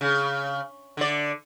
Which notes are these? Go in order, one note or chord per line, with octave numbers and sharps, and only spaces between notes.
C#3
D3 D5